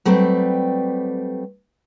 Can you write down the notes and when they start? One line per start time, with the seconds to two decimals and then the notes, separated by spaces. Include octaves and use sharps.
0.05 F#3 G3 A3 C4 B4